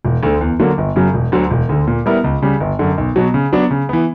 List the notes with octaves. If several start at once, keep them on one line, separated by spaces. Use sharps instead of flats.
E1
D2 D3
E2
D3 F#3 A#3
G1
F#2 C#3 F#3
E1
D2 D3 F#3
E1
D2 D3
A#2
G3 B3 E4 A#4
C#2
C#3 G3
G1
F#2 D3
B1
B2 F#3
C#3
F#3 B3 D4
C#3
E3 B3